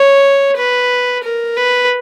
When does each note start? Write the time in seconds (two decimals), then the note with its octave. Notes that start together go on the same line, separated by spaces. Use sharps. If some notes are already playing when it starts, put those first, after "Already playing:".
Already playing: C#5
0.57 B4
1.23 A#4
1.57 B4